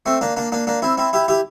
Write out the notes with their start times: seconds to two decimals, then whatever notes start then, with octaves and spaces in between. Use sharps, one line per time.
0.06 A3 C4
0.21 A#3 D4
0.36 A#3 D4
0.52 A#3 D4
0.67 A#3 D4
0.82 C4 E4
0.97 C4 E4
1.13 E4 G4
1.28 E4 G4